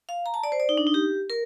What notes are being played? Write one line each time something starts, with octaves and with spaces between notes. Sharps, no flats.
F5
A#5
A5
D5
C5
D5
D#4
D4
D#4
G4
A#4